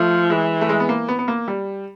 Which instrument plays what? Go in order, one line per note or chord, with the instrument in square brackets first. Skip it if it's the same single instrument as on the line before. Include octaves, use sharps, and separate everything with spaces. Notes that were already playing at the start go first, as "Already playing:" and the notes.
Already playing: [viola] F3 [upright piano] A3
[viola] E3 [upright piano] G#3
[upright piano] A3
G#3
B3
A#3
B3
B3
A#3
G3